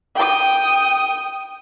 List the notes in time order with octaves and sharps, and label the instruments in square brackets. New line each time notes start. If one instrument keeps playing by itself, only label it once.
[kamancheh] G5 D#6